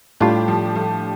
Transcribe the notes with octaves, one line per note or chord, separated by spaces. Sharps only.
A2 G3 D4 F4 G4
F3
F3 A3